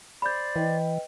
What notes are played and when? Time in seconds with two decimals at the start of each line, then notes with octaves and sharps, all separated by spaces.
0.22 C5 D5 B5 G6
0.56 E3 B4 D#5 G5